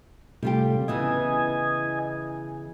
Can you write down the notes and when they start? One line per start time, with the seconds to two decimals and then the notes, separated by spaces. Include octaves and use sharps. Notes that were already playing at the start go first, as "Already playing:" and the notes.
0.43 C3 G3 A3 F4 G4
0.88 C#3 E3 B3 D#5 G#5